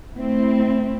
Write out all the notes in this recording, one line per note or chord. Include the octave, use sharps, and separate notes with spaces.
A3 C4 E4